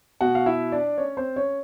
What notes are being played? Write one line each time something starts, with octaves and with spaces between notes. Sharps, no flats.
B2 F#4 F#5
F5
E4 E5
D4 D5
C#4 C#5
C4 C5
C#4 C#5